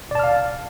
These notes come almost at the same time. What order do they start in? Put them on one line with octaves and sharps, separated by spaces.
D5 A5 F6 F5